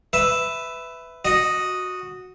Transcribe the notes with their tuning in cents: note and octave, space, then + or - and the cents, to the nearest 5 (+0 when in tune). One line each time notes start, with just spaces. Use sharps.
B4 +15 E5 +0
F#4 -10 D#5 +0